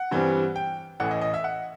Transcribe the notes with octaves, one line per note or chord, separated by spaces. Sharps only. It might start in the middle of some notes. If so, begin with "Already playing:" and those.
Already playing: F#5
G2 E3 G3 C4
G5
A1 A2 E3 F#5
D#5
D#5
E5
F#5